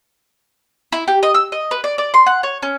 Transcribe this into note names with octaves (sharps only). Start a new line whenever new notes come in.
E4
G4
D#5
E6
D#5
B4
D5
D5
C6
F#5
C#5
C#4